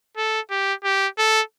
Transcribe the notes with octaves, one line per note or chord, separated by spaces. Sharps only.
A4
G4
G4
A4